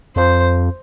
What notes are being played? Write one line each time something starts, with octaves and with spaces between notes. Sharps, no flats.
F2 C5